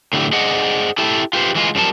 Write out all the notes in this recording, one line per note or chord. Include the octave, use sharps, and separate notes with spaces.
A2 D3 E4 G4
G#4 C5 D5 D#5 F#5
E4 G4 A4
F4 G4 B4 C5
E3 G#3 F4
F#2 F3 G3 D4 A#4 A5